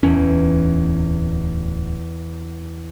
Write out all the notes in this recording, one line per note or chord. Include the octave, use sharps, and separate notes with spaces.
D1 E2 C#4